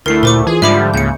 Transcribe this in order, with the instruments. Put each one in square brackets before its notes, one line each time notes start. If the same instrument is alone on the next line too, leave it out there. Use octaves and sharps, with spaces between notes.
[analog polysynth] D2 A3 [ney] E4 [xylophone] A#4 C7
[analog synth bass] A#2 [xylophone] A#4 C5 D6
[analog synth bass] E3 [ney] F4 [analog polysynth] G#4
[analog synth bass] G#2 [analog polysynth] D3 F3 G3 [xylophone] E5 B5 D6
[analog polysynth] C#2 C#3 [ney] A#3 [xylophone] G6 C#7